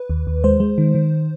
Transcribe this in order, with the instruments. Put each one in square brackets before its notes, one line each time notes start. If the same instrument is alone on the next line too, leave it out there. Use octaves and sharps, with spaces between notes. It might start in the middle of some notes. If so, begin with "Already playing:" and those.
Already playing: [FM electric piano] B4
D#2
D#2
G#3 C5
G#3
D#3
D#3